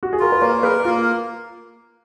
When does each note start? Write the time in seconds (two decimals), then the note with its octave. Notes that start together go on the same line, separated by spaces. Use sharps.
0.03 F#4
0.13 G#4
0.19 F4 A#4
0.32 B4
0.42 A#3 A#4 C#5
0.63 G#4 A#4 B4
0.85 A#3 F4